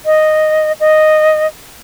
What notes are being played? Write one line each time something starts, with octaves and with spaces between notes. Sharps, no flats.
D#5
D#5